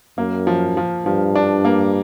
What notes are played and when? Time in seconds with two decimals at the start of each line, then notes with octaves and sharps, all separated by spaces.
0.18 F#2 A#3
0.47 F3
0.77 F3
1.06 G2 F3
1.35 D4
1.65 A#3